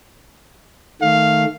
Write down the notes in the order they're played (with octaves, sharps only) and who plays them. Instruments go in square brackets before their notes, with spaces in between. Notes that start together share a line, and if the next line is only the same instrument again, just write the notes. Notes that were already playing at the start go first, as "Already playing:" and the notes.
[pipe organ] D#3 A3 [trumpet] F5